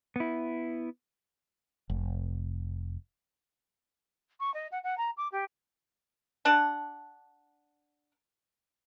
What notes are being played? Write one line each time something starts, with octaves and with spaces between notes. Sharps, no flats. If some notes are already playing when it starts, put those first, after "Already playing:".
B3 E4
F1
C#6
D#5
F#5
F#5
A#5
D6
G4
D4 F#5 A5